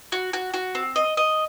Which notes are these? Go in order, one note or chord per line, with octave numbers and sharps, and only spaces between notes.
F#4
F#4
F#4
C4
D#5
D#5